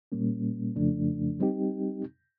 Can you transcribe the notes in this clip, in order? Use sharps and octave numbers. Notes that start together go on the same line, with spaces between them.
A#2 G3 A#3 C#4
F2 C#3 F3 A3 D4
G3 C4 D#4 G4